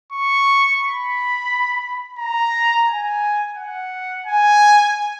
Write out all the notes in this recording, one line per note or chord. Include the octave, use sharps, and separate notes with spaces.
C#6
B5
A#5
G#5
F#5
G#5